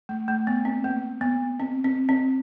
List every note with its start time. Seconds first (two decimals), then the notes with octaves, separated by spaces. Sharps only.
0.09 A3
0.28 A3
0.47 B3
0.65 C4
0.84 A#3
1.21 B3
1.60 C4
1.84 C4
2.09 C4